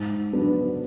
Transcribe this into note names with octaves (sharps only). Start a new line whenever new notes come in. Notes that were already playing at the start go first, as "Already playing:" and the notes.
Already playing: G#2
F#3 B3 D4